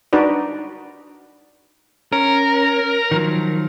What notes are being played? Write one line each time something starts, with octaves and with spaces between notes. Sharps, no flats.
D4 D#4 F#4 B4 D5
C#4 A#4
D#3 F3 F#3